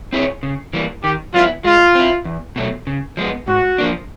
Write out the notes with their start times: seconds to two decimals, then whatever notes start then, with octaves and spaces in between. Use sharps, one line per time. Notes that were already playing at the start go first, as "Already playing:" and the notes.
0.13 C4 E4 G#4 C#5
0.43 C#3
0.73 E3 G3 A#3
1.04 D#3 G4
1.34 F#3 B3 E4 F4
1.64 G#3 F4
1.95 C4 E4
2.25 E2
2.56 B2 F#3 A3
2.87 C#3
3.17 F3 G#3 B3
3.48 G#2 F#4
3.78 F3 A#3 D4